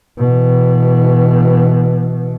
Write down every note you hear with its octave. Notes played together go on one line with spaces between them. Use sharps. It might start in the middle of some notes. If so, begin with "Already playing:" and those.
B2 E3